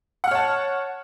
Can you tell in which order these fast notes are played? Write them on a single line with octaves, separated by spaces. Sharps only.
F#5 F6 C#5 A5